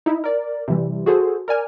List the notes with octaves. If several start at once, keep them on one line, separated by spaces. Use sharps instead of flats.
D#4 E4
A#4 D5
C3 E3 G3
F#4 G#4 A4 C5
A#4 D5 G#5 F6